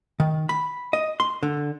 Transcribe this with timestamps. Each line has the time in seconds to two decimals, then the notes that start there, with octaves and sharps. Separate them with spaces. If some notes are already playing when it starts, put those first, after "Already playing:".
0.20 D#3
0.49 B5
0.93 D#5
1.20 C6
1.43 D3